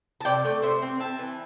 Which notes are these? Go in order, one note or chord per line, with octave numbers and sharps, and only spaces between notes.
A5
C3 D5 G5
A3 D5 G5
C3 C5 E5
C4
C4 E5 A5
E3